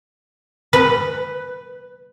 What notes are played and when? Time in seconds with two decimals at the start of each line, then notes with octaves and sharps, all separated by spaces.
0.73 B4